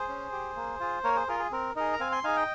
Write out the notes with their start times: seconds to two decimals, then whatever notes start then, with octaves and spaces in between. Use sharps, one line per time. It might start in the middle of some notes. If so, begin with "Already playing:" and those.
Already playing: G#4 C5
0.09 C#4
0.32 G4
0.56 A#3
0.80 F4 G#4
1.04 A#3 A#4 C#5
1.16 G#4 C5
1.28 F4 G#4 A#4
1.39 G#4
1.52 C4 A#4
1.76 D#4 G#4 A#4
1.93 A#5
2.00 C4 F5 G#5
2.12 G#5 C6
2.24 D#4 G#4 F5 G#5
2.36 D#5 G5